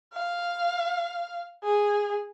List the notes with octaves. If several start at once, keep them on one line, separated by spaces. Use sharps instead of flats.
F5
G#4